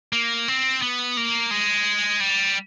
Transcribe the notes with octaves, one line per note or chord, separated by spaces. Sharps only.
A#3
C4
B3
A#3
G#3
G3